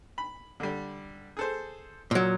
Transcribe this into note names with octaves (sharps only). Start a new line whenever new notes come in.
B5
D3 G3
G#4 A4 C5
A#2 F#3